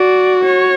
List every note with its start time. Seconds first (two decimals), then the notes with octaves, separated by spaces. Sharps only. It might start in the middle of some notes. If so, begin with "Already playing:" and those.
Already playing: F#4 D5
0.44 C#5